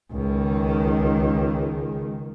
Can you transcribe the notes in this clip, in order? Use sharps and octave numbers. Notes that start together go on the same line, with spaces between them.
C#2 D#3